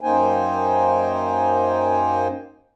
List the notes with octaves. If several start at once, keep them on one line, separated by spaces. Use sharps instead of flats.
F#2 A#3 D#4 C5 G5 G#5